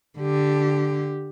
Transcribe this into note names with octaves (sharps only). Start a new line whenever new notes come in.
D3 G4